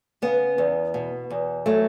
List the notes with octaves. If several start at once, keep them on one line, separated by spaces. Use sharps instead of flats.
C#3 B3
E2
B2
E2
F#3 A3